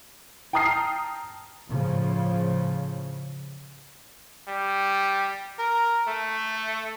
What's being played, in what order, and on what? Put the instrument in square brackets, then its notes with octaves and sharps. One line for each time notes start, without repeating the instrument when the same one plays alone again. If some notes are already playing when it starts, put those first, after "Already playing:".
[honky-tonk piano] G5 A5 A#5 D#6 F6 C7
[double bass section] A2 C#3 F3
[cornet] G3
A#4
A3